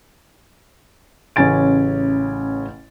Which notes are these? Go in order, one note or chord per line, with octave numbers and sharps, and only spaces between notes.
A1 C#3 C#4 G#5 A6 D7